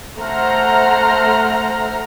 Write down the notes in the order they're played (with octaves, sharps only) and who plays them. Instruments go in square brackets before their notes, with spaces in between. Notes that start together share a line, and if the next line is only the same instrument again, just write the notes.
[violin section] A3 C5 F#5 A#5 F6